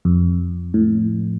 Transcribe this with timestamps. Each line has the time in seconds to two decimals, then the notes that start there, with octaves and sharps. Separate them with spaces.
0.05 F2
0.74 A2